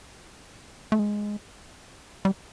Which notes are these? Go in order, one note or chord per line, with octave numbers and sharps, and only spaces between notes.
A3
G#3
G3